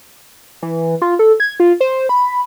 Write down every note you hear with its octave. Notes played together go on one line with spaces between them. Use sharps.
E3
F4
A4
G#6
F4
C5
B5